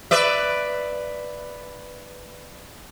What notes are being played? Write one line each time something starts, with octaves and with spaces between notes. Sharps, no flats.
B4 D5 E5